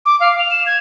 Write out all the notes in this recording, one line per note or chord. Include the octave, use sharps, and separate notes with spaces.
D6
F5
F7
E7
G#6